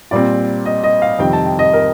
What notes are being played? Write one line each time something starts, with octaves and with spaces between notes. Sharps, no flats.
A#2 G3 C4 D5
D#5
D#5
F5
F2 C3 D#3 G3 C4 G5
A5
G5
D#5
A#4